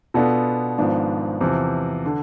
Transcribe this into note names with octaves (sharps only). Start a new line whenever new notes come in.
B2 B3 D4 F4 A4
G#1 G#2 F3 B3 D4
E2 C3 F3
D3